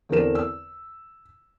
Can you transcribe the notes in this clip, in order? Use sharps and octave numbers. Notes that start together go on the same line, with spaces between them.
E2 D3 C4 A#4 E7
E6